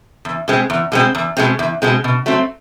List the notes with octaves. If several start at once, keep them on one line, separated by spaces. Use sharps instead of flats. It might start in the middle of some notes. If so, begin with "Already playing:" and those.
E2
B2 G#3 C4
E2
B2 G#3 C4
E2
B2 G#3 C4
E2
B2 G#3 C4
B2
F#3 A3 C4